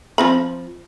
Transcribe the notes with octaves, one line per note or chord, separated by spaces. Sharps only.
F3 C4 B5